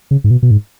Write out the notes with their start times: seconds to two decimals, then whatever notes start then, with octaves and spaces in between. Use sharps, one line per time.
0.11 C#3
0.24 G#2
0.31 B2
0.43 B2
0.51 G#2